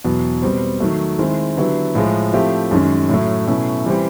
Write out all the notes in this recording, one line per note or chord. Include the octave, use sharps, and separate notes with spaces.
E2 B2 F#3
B2 G3 C4
D#3 F#3 A3
D#3 G#3 C4 E4
D3 F#3 B3 E4 G4
A2 F3 G#3
F3 A3 C4 E4 G4
F#2 D#3 G#3 C#4
A2 F#3 A3
B2 F#3 A3 C#4 E4
E3 G3 C4 E4 G4